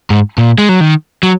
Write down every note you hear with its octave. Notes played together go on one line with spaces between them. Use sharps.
G#2
A#2
G#3
F#3
D#3
F#3